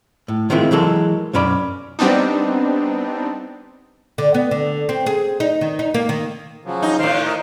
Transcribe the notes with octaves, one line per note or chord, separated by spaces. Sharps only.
A2
D#3 F3 G#3 A#3 C4 E4
E3 F#3 G#3 A4 A#4
B1 F#2 C#4 D5 B5
G3 B3 C4 D4 D#4
D3
B3
D3
C4
G#4
D#4
D#3
D#4
A#3
D#3
C#3 F3 F#3
D#4
A2 D#3 C5 F5
A#4 D#5